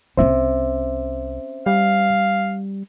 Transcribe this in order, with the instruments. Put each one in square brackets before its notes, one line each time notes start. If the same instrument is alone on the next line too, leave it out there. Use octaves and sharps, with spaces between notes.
[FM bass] C2 [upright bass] C4 C#4 [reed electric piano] C5 E5
[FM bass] G3 [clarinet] F5